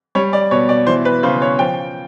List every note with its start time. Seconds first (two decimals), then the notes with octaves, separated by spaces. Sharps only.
0.15 G3 C#5
0.33 D5
0.51 B2 C#5
0.69 D5
0.87 E3 C5
1.05 B4
1.23 C#3 C5
1.42 C#5
1.59 F3 G5